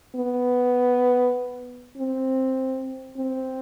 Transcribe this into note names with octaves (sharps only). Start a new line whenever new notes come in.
B3
C4
C4